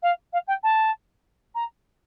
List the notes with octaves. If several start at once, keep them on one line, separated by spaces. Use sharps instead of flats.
F5
F5
G5
A5
A#5